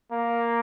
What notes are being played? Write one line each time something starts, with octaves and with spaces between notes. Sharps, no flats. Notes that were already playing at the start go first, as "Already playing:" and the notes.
A#3